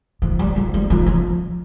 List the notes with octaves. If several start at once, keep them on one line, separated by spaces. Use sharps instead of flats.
F3
G3
F3
G3
F3
F3